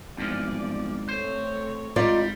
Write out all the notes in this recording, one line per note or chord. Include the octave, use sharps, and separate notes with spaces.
G#1 E2 G2 F3 D5
A3 C4 C5 C#5
G#1 G3 D#4 F4 D5